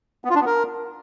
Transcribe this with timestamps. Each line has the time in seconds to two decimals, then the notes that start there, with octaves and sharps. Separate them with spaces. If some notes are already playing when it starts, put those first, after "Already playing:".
0.25 B3
0.30 F4
0.35 D4
0.41 B3
0.46 A#4